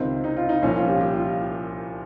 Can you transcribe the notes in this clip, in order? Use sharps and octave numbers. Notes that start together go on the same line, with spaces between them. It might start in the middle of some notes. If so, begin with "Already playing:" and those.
Already playing: C#2 C3 D#3 C4
D#4
F4
D#4
C2 A#2 F3 C#4
F4
G4
G4
F4